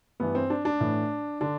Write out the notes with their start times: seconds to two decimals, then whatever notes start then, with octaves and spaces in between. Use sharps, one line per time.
0.20 G2 E3 B3
0.35 C4
0.50 D4
0.65 D4
0.80 A2 E3
1.41 D3 D4